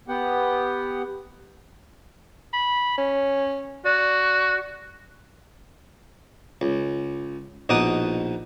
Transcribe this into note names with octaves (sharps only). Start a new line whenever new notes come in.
B3 G4 F#5
B5
C#4
F#4 D5
C#2
A#1 B2 D#4 F#5 D6 D#6